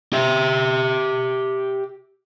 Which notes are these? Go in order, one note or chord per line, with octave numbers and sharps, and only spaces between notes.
G4 E5